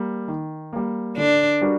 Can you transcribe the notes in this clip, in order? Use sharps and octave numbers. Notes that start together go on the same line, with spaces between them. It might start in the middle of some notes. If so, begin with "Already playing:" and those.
Already playing: G3 A#3
D#3
G3 A#3
D3 D4
G3 D4 F#4 A#4